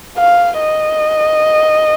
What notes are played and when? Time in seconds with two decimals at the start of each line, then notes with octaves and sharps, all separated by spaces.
0.17 F5
0.60 D#5